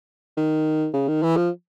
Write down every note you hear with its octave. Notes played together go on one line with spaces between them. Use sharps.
D#3
C#3
D#3
E3
F3